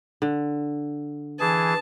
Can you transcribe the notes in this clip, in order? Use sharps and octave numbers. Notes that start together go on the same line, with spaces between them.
D3
E3 G#4 A5